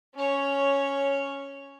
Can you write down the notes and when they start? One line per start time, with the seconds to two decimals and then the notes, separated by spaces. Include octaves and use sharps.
0.15 C#4 C#5